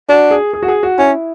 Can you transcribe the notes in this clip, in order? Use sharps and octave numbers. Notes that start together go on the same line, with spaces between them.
D4 F#4
G#4
G#4
F#4
G#4
F#4
C#4 E4